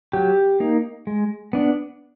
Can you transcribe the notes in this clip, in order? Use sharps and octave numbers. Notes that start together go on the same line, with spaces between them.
F#3 G4
A#3 D#4
G#3
B3 D4